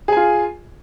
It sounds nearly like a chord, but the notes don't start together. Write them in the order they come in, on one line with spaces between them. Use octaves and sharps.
G#4 G#5 F4